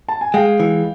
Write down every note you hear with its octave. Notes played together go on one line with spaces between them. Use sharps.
A5
G#5
G#3 F5 G5
E3